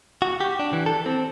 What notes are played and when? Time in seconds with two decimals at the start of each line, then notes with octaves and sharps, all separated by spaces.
0.22 F#4
0.40 G4
0.59 D4
0.73 E3
0.86 A4
1.06 C4